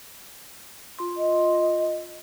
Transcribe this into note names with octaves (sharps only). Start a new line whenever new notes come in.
F4 C6
D#5